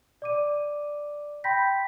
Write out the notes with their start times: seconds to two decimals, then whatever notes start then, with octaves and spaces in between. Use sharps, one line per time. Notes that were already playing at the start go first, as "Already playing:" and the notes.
0.22 D5 D6 D#7
1.44 G5 B5 C6 G6 A#6 B6